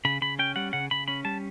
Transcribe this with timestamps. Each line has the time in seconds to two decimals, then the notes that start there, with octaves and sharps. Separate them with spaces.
0.05 C#3 B5
0.22 C#3 B5
0.39 C#4 G5
0.56 G3 F#5
0.73 C#3 F#5
0.91 C#3 B5
1.08 C#4 B5
1.25 G3 A5